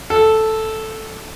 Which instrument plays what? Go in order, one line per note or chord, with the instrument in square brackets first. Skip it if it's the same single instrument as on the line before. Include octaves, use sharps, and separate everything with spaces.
[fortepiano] A4